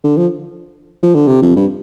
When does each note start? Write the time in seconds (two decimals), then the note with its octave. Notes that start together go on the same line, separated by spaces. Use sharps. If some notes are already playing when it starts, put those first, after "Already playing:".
0.04 D3
0.17 F3
1.03 F3
1.15 D3
1.27 C3
1.42 F2
1.56 G2